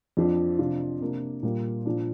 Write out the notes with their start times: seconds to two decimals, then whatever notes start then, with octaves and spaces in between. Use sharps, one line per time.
0.17 F2 F3 D4
0.58 C3 F3 D4 F4
1.01 C3 A#3 D4
1.43 A#2 G3 A#3 F4
1.85 A#2 F3 D4